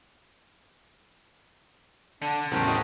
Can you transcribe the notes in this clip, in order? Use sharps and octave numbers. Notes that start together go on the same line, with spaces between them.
D3 D4
E2 A2 C#3 F#3 A3 G4 A#4 C5
D#5